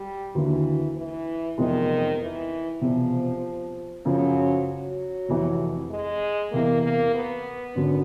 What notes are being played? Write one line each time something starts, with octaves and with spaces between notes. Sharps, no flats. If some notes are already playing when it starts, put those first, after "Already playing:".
Already playing: G3
D#2 D3 E3 F#3
E3
F1 E2 C3 D#3 F3 G#3
E3
E1 E2 C3 F3
F#2 C#3 F3 F#3
F#3
F1 F2 C3 E3
G#3
E2 C3 E3 A#3
A#3
B3
G#1 F#2 D3 F#3